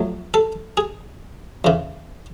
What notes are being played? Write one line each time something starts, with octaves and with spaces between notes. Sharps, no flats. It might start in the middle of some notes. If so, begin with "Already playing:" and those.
Already playing: F2 F#3 A3
A4
G#4
E2 C#3 E3